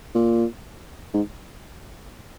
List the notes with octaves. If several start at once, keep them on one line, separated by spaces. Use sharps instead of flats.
A#2
G#2